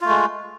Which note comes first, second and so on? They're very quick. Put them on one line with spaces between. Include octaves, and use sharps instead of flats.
F4 A3 G#3